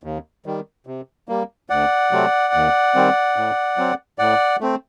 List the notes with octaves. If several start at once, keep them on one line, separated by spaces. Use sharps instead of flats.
D#2
D#3 G3
C3
G3 A#3
D2 D5 F#5
C3 F#3 A3 C4
D#2
D#3 G3 C4
A2
F#3 C4
A2 D5 F#5
A3 C4